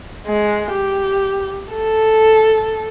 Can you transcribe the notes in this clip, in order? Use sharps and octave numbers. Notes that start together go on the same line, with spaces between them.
G#3
G4
A4